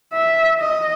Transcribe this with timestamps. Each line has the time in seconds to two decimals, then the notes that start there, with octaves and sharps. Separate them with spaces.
0.13 E5
0.59 D#5